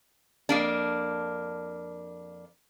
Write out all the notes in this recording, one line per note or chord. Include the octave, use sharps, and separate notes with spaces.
F2 A#3 D4